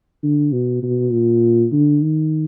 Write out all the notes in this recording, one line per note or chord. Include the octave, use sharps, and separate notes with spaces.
D3
B2
B2
A#2
D3
D#3